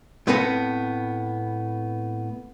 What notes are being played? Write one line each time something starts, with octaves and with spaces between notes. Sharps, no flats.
A2 B3 C4 A4 B4 F5